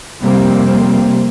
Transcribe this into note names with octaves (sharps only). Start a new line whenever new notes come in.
F2 C3 G3 A#3 C4